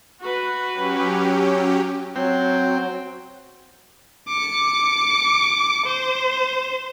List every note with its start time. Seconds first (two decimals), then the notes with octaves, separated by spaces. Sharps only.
0.20 F#4 B4
0.73 F#3 C#4 G4
2.16 F#3 C4 G5
4.28 D6 C#7
5.86 C5